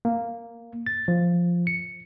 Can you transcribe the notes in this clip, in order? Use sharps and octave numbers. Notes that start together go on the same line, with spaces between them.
A#3
A6
F3
C#7